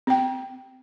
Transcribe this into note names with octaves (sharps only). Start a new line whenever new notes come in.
C4 G5